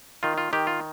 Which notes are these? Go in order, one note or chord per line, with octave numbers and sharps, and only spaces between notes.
D#3 F4
F4
D#3 G4
F4